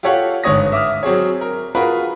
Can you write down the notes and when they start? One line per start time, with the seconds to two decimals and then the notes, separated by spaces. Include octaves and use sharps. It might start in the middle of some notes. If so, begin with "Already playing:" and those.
0.03 F4 G4 A4 C#5 F5 F#5
0.43 G1 G#2 C#5 D#6 A#6
0.72 E5 D6 D#6 F6
1.03 F#3 C4 G#4 C#5
1.41 A#4
1.75 F4 F#4 G#4 A#4 B4